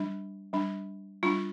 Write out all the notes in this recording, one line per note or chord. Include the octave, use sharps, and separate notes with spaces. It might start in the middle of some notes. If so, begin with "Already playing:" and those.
Already playing: G3 D4
G3 D4
G3 D4 F4